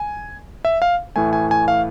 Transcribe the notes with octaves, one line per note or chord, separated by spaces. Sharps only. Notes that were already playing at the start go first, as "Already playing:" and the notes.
Already playing: G#5
E5
F5
A2 E3 A3 G#5
G#5
G#5
F5